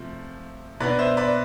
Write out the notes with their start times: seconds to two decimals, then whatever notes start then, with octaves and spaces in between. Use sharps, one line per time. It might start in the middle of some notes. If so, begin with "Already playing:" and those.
Already playing: C3 F3 A3 C4
0.80 B2 B3 D4 B4 D5
0.99 C5 E5
1.17 B4 D5